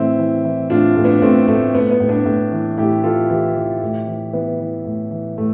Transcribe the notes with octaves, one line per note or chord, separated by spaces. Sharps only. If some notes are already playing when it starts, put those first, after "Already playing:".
Already playing: A2 E3 C4 E4
E3
E3
A2 D4 F4
A2
B3 D4
A2 A3 C4
A2 A3
A2 B3
B3
A2
B3 D4
A2
E3
A2 E4 G4
E3 F4 A4
E3 E4 G4
E3
A2
E3
E3 B3
E3
A2
E3
A2 A3